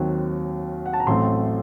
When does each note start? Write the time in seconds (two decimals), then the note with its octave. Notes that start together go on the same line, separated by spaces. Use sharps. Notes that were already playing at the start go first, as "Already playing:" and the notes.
Already playing: D#2 D#3 F#3 C4
0.86 F#5
0.93 A5
1.00 A#5
1.07 A1 A2 F#3 A3 C4 C6